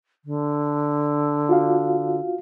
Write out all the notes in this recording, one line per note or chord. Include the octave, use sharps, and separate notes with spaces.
D3
F4 F#4 F5